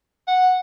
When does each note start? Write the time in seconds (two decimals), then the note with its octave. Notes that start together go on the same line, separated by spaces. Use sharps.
0.28 F#5